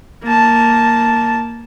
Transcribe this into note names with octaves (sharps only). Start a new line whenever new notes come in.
A#3 A5